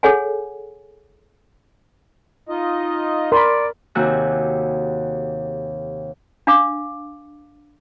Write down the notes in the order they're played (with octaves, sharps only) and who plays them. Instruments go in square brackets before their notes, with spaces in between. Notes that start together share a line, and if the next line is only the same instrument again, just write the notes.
[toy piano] G#4 A4 C#5 F#5 G#5
[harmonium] D#4 F4 D#5
[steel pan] A#4 B5 [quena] D5 [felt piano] C6
[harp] D#2 C3 F#4 G#5 F#6
[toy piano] D4 F5 D6